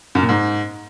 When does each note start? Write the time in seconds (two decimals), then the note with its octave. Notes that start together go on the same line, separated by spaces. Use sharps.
0.15 F#2
0.22 A#2
0.29 G#2